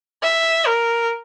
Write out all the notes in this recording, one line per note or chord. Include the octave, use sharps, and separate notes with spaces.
E5
A#4